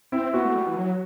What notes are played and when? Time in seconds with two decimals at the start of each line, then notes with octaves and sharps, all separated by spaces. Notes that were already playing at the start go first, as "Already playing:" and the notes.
0.12 C4 E4
0.34 B3 F#4
0.45 A3
0.55 G3
0.66 E3
0.77 F#3